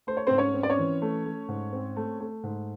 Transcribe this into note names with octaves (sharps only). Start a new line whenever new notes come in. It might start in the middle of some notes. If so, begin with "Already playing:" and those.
A3 C5
C#5
C4 C5
G#2
C#4 C#5
C4
D5
C#4 C#5
E3
A3
A3
G#2
C4
A3
A3
G#2